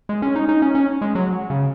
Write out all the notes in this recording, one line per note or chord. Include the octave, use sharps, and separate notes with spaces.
G#3
C#4
D#4
D#4
C#4
C#4
G#3
F#3
C#3